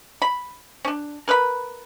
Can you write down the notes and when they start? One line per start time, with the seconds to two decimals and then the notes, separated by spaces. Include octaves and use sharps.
0.22 B5
0.85 C#4 D4
1.28 A#4 B4 D#5 B5